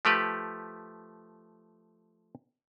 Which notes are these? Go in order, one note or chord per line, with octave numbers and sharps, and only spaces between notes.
F3 A3 G4 B4